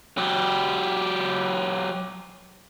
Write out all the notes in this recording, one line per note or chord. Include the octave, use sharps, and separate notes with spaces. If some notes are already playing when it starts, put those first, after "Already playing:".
F#3 G4